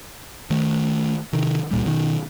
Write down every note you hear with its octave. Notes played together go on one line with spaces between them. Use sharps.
D#3 A3
C3 D#3
C#2 A#2 G3
B2 D#3